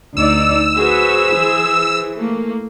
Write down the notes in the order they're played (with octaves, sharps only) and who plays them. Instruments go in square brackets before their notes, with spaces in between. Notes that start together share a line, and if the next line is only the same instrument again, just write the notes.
[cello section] D2 D#4 D5 [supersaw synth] E6
[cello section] F#4 B4 [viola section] G#4 C5
[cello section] E3
[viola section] A3 A#3